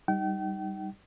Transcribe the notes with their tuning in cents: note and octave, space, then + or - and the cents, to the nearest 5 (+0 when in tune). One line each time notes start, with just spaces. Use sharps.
G3 +0 D#4 +0 G5 -40